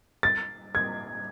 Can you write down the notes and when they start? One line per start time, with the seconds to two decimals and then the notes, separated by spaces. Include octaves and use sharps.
0.23 A6
0.75 G#6